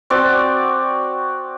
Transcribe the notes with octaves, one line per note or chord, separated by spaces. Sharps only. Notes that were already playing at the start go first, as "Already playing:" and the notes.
C4 F#4 D5